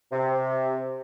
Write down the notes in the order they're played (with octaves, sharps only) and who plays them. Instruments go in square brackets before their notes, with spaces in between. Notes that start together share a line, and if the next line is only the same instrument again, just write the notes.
[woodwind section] C3